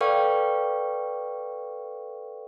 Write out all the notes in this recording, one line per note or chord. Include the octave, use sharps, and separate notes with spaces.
A4 B4 D5 F5 G5 C#6